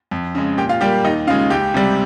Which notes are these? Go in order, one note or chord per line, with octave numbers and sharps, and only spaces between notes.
F2
C#3 G#3
A#2 G4 G5
F4 F5
G3 A#3 G4 G5
D#2 D#4 D#5
C#3 G#3 F4 F5
C#2 G4 G5
C3 G3